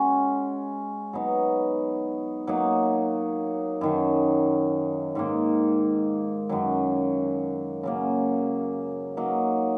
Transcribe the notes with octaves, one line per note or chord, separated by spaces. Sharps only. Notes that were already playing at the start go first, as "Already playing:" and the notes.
Already playing: G#3 C#4 F#4
F#3 B3 D#4
F#3 A#3 D#4
F#2 D#3 F#3
G#2 D#3 A#3
F#2 D#3 F#3
C#3 F#3 A#3
F#3 A#3 D#4